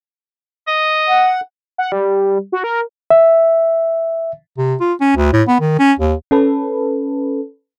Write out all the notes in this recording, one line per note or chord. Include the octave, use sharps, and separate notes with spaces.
D#5
F#5
F#5
G3
F#4
A#4
E5
C3
F4
C#4
D2
A2
B3
D#3
C#4
D#2
C#4 A4 B4